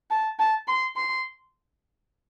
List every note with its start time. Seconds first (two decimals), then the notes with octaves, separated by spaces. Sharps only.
0.10 A5
0.39 A5
0.68 C6
0.96 C6